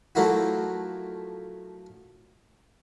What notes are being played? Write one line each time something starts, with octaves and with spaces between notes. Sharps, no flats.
F3 F#3 A3 A#3 E4 F#4